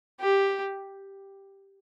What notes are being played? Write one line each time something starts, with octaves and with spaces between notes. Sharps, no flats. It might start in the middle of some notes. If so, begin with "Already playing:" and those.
G4